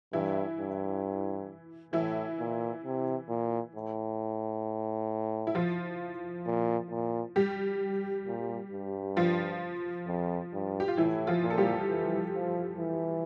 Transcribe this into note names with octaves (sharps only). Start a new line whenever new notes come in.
G2 E3 E4
G2
A2 E3 E4
A#2
C3
A#2
A2
E4
F3 F4
A#2
A#2
G3 G4
A#2
G2
F3 F4
F2
G2
G4
F4
A2 E3 E4
F3 F4
A#2
A4
G3 G4
E3
F3
E3